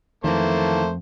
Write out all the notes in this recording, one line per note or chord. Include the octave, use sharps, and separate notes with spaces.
F2 D#3 E3 A3 A#3 C5 A5